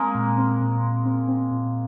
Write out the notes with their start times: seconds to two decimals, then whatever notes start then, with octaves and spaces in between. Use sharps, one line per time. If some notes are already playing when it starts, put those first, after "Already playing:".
Already playing: G#3 A#3 C4
0.15 A#2
0.38 C4
0.61 A#2
0.83 A#2
1.05 C4
1.28 C4
1.51 A#2